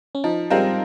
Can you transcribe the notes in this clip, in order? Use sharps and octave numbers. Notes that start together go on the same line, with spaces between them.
C#4
F3 D#4
G3 G#3 C4 F4 A#4